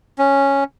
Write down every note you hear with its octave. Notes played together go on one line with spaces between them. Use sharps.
C#4